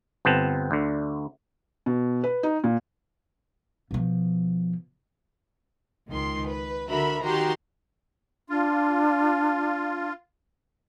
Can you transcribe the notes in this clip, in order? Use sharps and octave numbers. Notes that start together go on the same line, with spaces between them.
G1 B3 C4 A5
D2 D3
B2
B4
D#4
A#2
B2 F3
C#2 D#3 C6
B4
D3 F#4 A#4 E5 B5
D#3 F#4 G4 A#5 C6
D4 F4